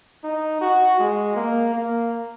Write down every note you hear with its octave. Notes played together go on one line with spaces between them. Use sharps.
D#4
F#4
G#3
A#3
A#3